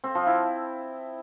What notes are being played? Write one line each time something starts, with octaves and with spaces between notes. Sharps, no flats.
C4
F3
E4